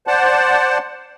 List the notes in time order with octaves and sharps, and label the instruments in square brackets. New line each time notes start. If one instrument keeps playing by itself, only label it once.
[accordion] C5 D5 F#5 A5